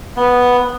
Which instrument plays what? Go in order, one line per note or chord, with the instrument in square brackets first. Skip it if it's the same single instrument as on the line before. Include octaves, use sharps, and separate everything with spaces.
[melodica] B3